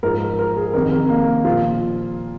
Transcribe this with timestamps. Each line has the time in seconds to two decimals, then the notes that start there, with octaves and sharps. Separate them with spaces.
0.03 G#2 F3 A#4
0.20 A#4
0.39 A#4
0.56 G#4
0.73 F2 C3 D#3 A#4
0.91 A#4
1.09 A#3
1.45 A#2 F3 F4